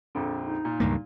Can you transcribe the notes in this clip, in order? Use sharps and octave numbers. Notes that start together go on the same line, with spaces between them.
A#1 F2 D3
D#4
A#2
C#2 G2 A#3